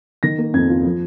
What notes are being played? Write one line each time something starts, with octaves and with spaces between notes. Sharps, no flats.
D#3 A#6
A#3
F2 G#6
F4
F3